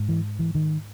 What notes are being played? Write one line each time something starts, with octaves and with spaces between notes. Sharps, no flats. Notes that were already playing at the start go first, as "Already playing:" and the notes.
Already playing: G#2
E3
E3
D#3